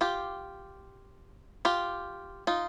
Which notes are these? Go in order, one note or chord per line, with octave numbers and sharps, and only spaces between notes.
F4 G4
F4 G4
D#4 F4